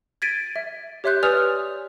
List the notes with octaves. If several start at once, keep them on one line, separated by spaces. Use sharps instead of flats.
G#6 A6 B6 D7 D#7
E5
G4 C#5 E5 C6 F#6 G6
B4 D5 G#5 D#6 F6 F7